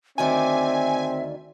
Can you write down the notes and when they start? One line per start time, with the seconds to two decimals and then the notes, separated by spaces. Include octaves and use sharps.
0.18 D2 D#3 C4 D5 E5 G#5